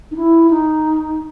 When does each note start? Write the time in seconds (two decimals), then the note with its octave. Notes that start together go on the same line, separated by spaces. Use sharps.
0.11 D#4
0.16 E4
0.50 D#4